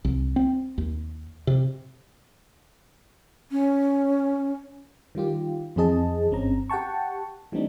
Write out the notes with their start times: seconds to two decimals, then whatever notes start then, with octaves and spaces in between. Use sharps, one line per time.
0.04 C2
0.36 C4
0.78 D#2
1.47 C3
3.51 C#4
5.15 D#3 G3 F4 G4
5.76 F2 E3 C4 G#4 D#5 A5
6.30 G1 G2 C4 C#4 A#5
6.70 G4 F#5 G5 A5 C#6
7.52 E3 G3 A3 C4 D4 D#4